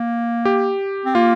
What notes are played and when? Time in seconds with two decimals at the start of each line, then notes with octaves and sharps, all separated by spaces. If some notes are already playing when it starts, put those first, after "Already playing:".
Already playing: A#3
0.45 G4
1.06 C4
1.15 A#3 F4